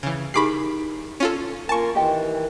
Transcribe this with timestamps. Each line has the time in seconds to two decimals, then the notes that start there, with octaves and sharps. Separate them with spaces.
0.03 C#3 E3
0.34 D#4 E4 G4 G#4 A#4 B5 D6 C7
1.20 C#4 F4 A4
1.69 A#3 F4 A#4 G#5 A5 C#6
1.95 D#3 E3 G4 D#5 G5